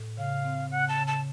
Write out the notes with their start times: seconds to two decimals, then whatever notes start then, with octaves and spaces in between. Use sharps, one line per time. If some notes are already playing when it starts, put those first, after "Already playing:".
Already playing: A2
0.17 C#3 F5
0.44 C4
0.71 C#3 F#5
0.89 A5
0.97 C#3
1.07 A5